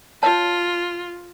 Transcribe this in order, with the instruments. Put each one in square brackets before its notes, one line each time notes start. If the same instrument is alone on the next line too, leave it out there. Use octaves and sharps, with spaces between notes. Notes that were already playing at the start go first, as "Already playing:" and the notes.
[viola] F4 [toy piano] C#5 A5